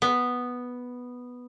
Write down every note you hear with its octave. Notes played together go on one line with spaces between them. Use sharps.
B3